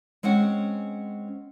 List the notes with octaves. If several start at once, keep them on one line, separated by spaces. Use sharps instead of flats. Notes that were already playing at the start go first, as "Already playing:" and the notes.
G#3 C4 C#4 F#5